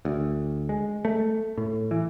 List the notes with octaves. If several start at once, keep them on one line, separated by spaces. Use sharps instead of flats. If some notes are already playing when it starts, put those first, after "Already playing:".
D2
G#3
A3
A2
E3